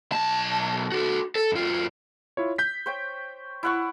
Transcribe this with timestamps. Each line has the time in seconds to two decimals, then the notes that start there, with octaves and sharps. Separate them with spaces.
0.12 B1 A5
0.92 F#4 A4
1.36 A4
1.52 F#2 F4
2.37 E4 F4 C#5
2.58 G6 B6
2.86 C5 C#5 G5
3.63 E4 F#5 C#6